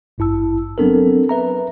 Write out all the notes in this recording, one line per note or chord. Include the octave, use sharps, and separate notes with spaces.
G#1 G2 E4 A5 E6
F#3 B3 C4 D4 A4 A#4
B4 E5 A#5